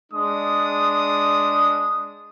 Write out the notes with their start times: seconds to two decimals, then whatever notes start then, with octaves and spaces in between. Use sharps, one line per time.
0.12 G#3 D4 D#6